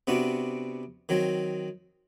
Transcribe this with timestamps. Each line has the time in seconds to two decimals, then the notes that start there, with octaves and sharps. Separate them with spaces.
0.07 C3 B3 C4 D4 F#4
1.09 D#3 F#3 C4